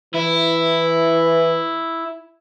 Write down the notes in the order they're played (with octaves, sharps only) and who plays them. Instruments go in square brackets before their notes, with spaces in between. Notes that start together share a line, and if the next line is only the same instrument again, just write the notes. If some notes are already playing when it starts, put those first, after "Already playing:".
[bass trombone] E3 [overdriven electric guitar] E4